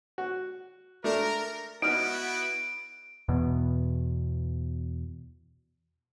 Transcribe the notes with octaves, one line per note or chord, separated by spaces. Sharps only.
F#4
A3 D4 A#4
B3 D#4 E4 F#4 F6 D7
E2 B2